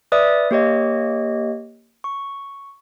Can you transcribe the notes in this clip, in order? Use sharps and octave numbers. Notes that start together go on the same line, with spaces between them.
B4 D5 E5 D#6
A#3 G4 C#5 D#5
C#6